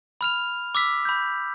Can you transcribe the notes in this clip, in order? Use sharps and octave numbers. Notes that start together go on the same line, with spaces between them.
B5 F6 F7
D6 E6 B6
B5 G6